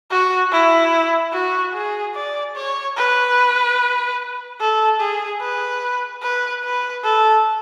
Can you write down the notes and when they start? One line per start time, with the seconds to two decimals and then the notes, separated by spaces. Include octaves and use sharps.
0.11 F#4
0.52 E4
1.33 F#4
1.74 G#4
2.15 D5
2.56 C#5
2.97 B4
4.60 A4
5.00 G#4
5.41 B4
6.22 B4
6.63 B4
7.04 A4